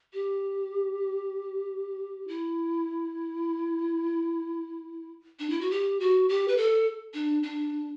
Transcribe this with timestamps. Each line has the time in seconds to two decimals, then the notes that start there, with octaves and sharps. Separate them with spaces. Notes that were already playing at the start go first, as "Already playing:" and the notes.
0.13 G4
2.28 E4
5.39 D4
5.50 E4
5.61 F#4
5.71 G4
6.00 F#4
6.29 G4
6.48 B4
6.57 A4
7.14 D4
7.43 D4